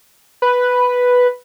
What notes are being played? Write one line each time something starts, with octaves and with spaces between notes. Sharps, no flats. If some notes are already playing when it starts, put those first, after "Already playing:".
B4